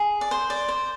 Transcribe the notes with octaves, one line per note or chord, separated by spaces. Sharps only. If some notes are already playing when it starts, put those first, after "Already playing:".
Already playing: G#4
D5
C5
D5
C5